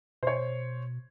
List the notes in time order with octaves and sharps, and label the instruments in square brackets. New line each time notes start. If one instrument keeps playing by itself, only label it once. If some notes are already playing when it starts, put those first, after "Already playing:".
[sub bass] B2 [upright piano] C5 C#5